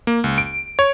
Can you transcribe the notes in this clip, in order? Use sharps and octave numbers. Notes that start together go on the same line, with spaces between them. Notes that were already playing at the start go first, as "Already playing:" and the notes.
A#3
C#2
D7
C#5